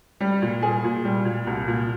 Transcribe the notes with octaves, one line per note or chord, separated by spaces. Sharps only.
G3
A#2
G#4
A#2
G3
A#2
C2
A#2